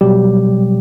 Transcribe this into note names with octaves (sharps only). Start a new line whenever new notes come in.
B2 F#3 G3 G4